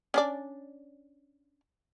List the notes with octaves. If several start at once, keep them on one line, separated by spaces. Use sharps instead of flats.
C#4 D4 D5